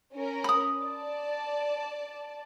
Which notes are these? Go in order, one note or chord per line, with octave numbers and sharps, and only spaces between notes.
C#4 A#4
B5 D#6
D5 A5